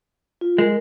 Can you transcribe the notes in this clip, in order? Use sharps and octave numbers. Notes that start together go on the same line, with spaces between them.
F4
G#3 A#4